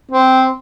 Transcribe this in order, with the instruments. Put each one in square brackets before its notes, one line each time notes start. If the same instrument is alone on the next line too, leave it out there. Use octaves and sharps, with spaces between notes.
[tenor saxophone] C4